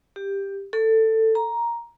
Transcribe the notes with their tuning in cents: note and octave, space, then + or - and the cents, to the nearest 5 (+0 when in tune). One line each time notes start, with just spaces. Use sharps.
G4 +10
A4 +15
A#5 +10